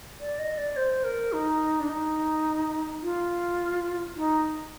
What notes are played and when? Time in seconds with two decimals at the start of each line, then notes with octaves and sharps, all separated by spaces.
0.20 D5
0.39 D#5
0.57 D5
0.76 C5
1.04 A#4
1.33 D#4
1.80 D4
1.89 D#4
3.03 F4
4.17 D#4